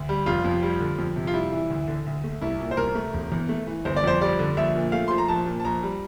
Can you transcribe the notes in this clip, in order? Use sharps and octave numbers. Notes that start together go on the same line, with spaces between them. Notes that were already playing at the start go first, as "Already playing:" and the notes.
Already playing: D2
G3
F1 F4
F2
G3
D3
F2
C3
F4
G3 E4
E3
D2
D3
D2
A3
C2 E4
A#2
C5
C2 A#4
A3
E1
E2
A3
E3
G1 C5
D5
F2 C5
G3 D5
D3
A#1 E5
A#2
A3 F5
F3 C6
A#5
A#1 A5
A#2
A5
A#1 A#5
G3